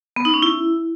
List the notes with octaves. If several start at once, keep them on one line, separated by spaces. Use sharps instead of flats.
B3
D#4
C#4
E4